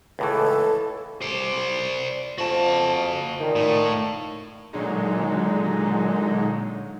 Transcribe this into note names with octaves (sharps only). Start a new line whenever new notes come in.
C#2 A2 E3 A4
C5 D5
F2 F3 F#4 A5
A#2 D#3
A2
A#2 D3 F#3 G#3 D#4